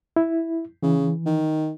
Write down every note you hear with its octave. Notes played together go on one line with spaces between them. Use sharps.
E4
C#3 E3
D#3